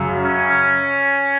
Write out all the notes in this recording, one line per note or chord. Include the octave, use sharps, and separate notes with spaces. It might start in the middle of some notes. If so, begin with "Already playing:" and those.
Already playing: F#2 C#3
C#4